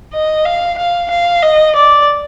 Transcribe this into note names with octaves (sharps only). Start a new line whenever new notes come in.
D#5
F5
F5
F5
D#5
D5